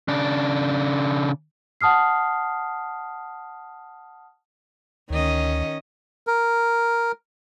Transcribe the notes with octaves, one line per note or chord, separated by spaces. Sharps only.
C#3 D4
F#5 A5 D#6 F6 C7
D2 D#3 C#4 D#5
A#4